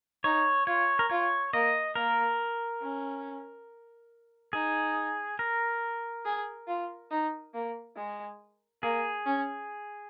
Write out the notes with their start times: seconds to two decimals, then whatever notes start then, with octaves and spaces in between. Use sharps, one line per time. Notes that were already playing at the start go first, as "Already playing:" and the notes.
0.24 D#4 C#5
0.67 F4 C#5
0.99 A#4
1.10 F4 C#5
1.53 A#3 D#5
1.95 A#3 A#4
2.82 C#4
4.53 D#4 G#4
5.39 A#4
6.25 G#4
6.67 F4
7.11 D#4
7.54 A#3
7.96 G#3
8.83 A#3 G#4
9.26 C#4